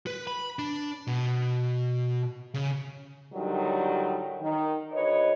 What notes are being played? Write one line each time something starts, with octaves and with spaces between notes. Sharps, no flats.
B4
B5
D4
B2
C#3
A2 D3 D#3 F#3 G3
D#3
D2 B4 C#5 D#5